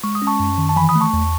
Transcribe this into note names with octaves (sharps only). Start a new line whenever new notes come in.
G#3 C#6
D#6
C#4
A5 C#6
F#2
D#3
A5
E3 G#5 B5
B5 D#6
A3
A5 C#6
E2